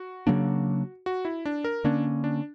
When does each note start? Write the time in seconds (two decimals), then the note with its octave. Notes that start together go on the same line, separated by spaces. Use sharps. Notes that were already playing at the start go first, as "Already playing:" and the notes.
Already playing: F#4
0.27 C#3 F#3 A#3 D4
1.06 F#4
1.25 E4
1.45 D4
1.64 A#4
1.84 D3 A#3 C#4 D4
2.24 D4